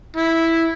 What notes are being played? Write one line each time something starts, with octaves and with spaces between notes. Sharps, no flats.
E4